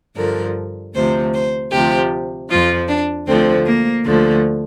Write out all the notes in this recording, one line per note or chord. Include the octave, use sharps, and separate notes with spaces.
G2 D3 F3 A#4
D2 C3 F3 C5
C5
D2 C3 F3 G4
F2 F3 F4
D4
D2 D3 F3 C4
A#3
D2 D3 F3